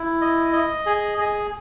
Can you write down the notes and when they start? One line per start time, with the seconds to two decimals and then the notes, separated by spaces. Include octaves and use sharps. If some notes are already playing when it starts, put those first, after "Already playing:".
Already playing: E4
0.21 D#5
0.53 D#5
0.86 G#4
1.18 G#4